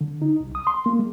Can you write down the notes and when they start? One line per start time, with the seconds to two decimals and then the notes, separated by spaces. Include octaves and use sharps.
0.01 D3
0.22 D#4
0.41 C2
0.55 D#6
0.67 C6
0.86 A#3
0.99 G#3